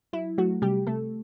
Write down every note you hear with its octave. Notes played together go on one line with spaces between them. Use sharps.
F#3 E4
F#3 A3 F#4
C3 G3 G4
C3 A3 A4